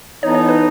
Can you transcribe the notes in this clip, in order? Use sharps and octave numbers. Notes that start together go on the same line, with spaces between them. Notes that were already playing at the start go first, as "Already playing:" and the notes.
E3 B3 D#4 A4 C#5
C#5
B4